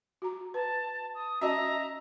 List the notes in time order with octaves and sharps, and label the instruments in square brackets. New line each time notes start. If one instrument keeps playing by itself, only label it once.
[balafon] F#4 A#5
[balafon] B4 [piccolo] A5
[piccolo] D#6
[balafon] C#4 F#4 A5 [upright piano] D#5 E5 [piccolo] A#5